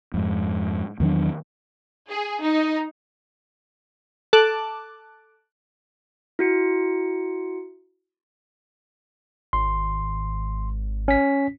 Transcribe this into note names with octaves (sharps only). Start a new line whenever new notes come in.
F2 G#2
E2 D#3 F#3 D4
G#4
D#4
A4 A5 D6 F#6
E4 F#4 C#7
G#1 C6
C#4 B6